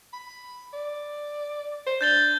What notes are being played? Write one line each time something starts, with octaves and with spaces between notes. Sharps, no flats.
B5
D5
C5
D4 G6 A6 G7